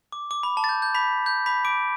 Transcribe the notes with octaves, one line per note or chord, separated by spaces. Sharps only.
D6
D6
B5
A5
A6
G6
G6
B5 B6
G6
B5 B6
D6 D7